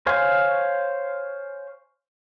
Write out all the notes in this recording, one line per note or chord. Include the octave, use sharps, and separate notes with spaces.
C5 C#5 F5 G#5